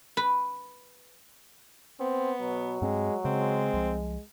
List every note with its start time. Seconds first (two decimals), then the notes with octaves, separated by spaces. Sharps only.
0.17 B4
2.00 B3 C4
2.41 B2 F#3
2.82 G2 G#3 C4
3.25 C#3 G#3 C4
3.74 C2 F3